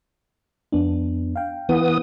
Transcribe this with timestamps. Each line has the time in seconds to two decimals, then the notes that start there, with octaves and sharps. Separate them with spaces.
0.72 F2 B3 D4
1.36 F5 G5
1.69 E3 B3 D#6